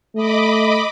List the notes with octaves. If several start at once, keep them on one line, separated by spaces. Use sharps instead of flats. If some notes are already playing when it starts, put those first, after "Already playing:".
A3 D#5 B5 D6